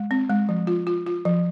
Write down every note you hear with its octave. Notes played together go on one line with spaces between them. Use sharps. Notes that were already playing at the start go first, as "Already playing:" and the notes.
Already playing: G#3
C4
G#3
F3
F4
F4
F4
F3